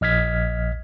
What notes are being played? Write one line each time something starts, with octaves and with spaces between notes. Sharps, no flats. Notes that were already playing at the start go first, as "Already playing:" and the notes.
A#1 D#5 F6 G#6 B6